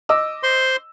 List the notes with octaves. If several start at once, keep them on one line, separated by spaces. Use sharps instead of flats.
D#5 D6 E6
C5 C6